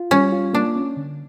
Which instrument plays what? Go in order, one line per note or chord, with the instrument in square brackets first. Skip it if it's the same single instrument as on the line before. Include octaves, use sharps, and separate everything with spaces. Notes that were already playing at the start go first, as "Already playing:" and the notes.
Already playing: [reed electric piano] F4
[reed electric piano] G3 [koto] C#4
[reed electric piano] F4
[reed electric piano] A#3 [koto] D4
[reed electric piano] C#4
D3